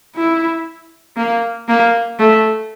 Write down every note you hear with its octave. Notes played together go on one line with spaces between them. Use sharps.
E4
A#3
A#3
A3